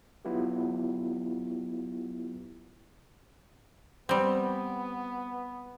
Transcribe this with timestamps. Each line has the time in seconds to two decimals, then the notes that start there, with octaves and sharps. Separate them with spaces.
0.25 F#3 B3 E4 F4 G4
4.09 G3 B3 C4